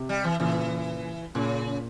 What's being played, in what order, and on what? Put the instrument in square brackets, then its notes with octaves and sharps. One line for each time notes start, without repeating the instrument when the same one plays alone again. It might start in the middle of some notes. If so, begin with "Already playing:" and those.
Already playing: [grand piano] C3
[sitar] G3
E3
[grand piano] A#2 C#3 [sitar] E3
[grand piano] A#2 [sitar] C#3